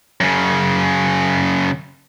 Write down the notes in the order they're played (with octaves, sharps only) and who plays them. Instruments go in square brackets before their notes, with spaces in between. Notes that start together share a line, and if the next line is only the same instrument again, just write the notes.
[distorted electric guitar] F#2 C#3